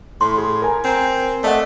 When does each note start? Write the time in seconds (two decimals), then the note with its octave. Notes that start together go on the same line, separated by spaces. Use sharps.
0.21 A2 C6
0.38 G#4
0.62 A#4 G#5 A#5
0.84 C4
1.44 A3 D5 D#5 F#5